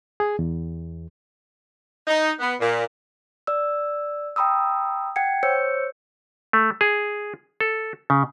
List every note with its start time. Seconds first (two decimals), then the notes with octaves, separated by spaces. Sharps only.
0.20 G#4
0.39 E2
2.07 D#4
2.40 B3
2.60 A#2
3.47 D5 E6
4.36 G5 A#5 B5 D#6 E6
5.16 F#5 G5 G#6 C#7
5.43 C5 C#5 E6 G6 C#7
6.53 A3
6.81 G#4
7.60 A4
8.10 C#3